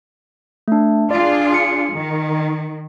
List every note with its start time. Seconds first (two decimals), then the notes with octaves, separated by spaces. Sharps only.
0.68 A3 D4
1.11 D4 F4 G#4 D5
1.54 C#7
1.91 D#3